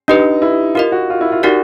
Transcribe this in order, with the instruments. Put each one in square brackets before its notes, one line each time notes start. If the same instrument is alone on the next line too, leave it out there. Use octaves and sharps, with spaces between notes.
[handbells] D4 G4 B4 [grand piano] D#4
[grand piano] E4
[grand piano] F4 [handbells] G4 A#4 D#5
[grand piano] F#4
F4
E4
F4
[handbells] D#4 G4 A#4 D5 [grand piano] F#4